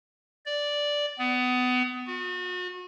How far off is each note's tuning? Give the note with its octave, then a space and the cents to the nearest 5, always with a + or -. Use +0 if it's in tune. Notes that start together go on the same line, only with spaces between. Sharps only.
D5 -5
B3 +25
F#4 -35